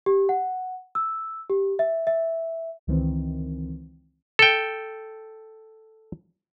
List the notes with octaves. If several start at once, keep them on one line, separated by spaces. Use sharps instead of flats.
G4
F#5
E6
G4
E5
E5
C#2 D#3 E3 C4
A4 G5